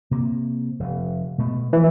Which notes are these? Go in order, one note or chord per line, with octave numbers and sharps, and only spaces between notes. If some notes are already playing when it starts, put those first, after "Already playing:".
C3 A#3
F1
B2 A3
E3 F3